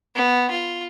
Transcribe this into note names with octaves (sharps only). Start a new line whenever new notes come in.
B3
F4